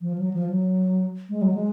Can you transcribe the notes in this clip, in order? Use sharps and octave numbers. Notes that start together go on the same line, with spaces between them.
F3
F#3
F3
F#3
G#3
F#3
G#3